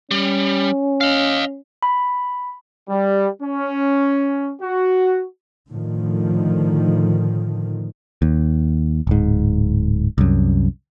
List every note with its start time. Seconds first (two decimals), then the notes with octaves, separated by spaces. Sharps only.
0.11 G3 C#4
1.01 D#5 F5
1.83 B5
2.90 G3
3.42 C#4
4.62 F#4
5.69 A2 D3 D#3 F3
8.22 D#2
9.07 D1 G#2
10.18 C2 F#2